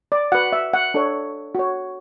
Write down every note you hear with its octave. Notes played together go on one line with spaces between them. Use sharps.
D5
F#4 B4 F#5
E5
F#5
D4 A4 C#5
F#4 C#5